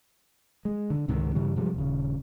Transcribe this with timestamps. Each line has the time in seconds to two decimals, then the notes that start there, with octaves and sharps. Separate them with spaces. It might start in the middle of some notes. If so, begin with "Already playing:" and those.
0.65 G#3
0.90 D3
1.08 C#2 G#2 C3 D#3
1.35 G2 C#3 E3 G3
1.56 C3 F3 G3 G#3
1.74 D#1 C#3